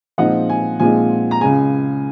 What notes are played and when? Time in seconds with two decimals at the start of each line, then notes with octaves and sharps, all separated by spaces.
0.18 A#2 F3 G#3 C4 D#4 F#5
0.49 G#5
0.80 A#2 F3 G#3 C4 D#4 G#5
1.31 A#5
1.41 C#2 C#3 G#3 G#5